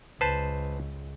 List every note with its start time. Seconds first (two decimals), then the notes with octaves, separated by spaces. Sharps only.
0.21 C#2 B4 C5 A5